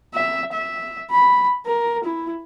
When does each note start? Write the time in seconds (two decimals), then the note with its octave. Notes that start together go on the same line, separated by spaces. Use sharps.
0.15 E5
0.53 E5
1.11 B5
1.66 A#4
2.04 E4